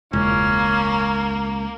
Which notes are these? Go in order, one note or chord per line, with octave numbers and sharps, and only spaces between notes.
E1 C#2 A#3 C#4